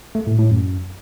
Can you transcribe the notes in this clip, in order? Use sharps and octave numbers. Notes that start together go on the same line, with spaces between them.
A3
A2
A2
F#2